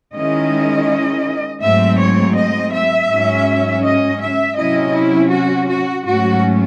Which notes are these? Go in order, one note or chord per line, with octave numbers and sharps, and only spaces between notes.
D#3 G#3 C#4 E4 D#5
G#2 F#3 A3 C4 E5
C#5
D#5
E5
G#2 F#3 C#4
D#5
E5
C3 F#3 C#4 E4 D#5
E4
F#4
F#4
G#2 F#3 A3 C#4 F#4